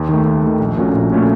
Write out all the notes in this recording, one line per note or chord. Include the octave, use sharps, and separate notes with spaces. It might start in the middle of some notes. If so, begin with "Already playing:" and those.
Already playing: D#2
D#3 A3
D#2
D#3 A3
A#1
A#2 A3 C#4 F#4
A#1
A#2 A3 C#4 F#4